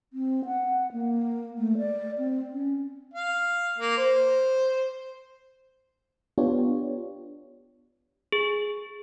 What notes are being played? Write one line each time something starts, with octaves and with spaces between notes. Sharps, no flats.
C4
F#5
A#3
A3
D5
C4
C#4
F5
A#3
C5
B3 D4 F4 G4 C#5
G#4